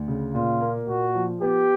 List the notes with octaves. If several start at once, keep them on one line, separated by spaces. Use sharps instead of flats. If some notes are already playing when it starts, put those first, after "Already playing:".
Already playing: D2
C#3
A#2 F4
A#3
A#2 F#4
F3
B3 G4